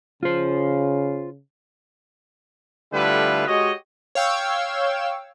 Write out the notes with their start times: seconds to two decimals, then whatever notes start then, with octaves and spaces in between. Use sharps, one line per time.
0.23 C#3 F4 C5
2.93 D3 G3 A3 E4 F4 B4
3.48 G#3 F#4 G4 C#5 D#5
4.15 C#5 F5 G5 E6